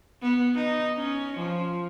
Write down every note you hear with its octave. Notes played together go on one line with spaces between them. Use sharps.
B3
D#4
C#4
F3